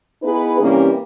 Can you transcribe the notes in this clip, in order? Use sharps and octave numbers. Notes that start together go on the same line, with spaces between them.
B3 D#4 E4 G#4 B4
C3 E3 G3 A#3 C#4 G4